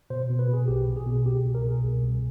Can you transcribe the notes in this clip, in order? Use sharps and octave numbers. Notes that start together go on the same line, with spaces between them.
B2 C5
B2
B4
B2 G#4
B1 G4
B2
G#4
B2
C2 G4
B2
A#4
B2 G#4
C2
C2